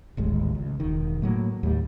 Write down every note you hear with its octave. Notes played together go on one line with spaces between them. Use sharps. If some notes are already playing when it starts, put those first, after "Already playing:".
D#1 A1 D#2 G#3
C#2
E1 D#3
A2 F#3 G3 A#3
D#2 A2 G3